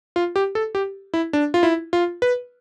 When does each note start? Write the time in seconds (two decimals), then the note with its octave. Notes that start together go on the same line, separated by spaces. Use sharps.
0.16 F4
0.36 G4
0.55 A4
0.75 G4
1.14 E4
1.33 D4
1.54 F4
1.63 E4
1.93 F4
2.22 B4